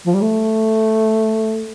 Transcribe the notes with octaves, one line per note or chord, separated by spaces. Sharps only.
F3
G3
A3